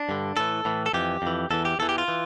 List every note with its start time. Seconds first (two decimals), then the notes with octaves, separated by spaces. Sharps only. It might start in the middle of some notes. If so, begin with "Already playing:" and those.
Already playing: D4
0.09 G2 D3
0.37 A2 E3 A4
0.65 A2 E3
0.86 A4
0.93 F2 E3 G4
1.22 F2 E3
1.50 E2 E3 A4
1.65 G4
1.79 E2 E3 A4
1.89 G4
1.98 F4
2.08 E3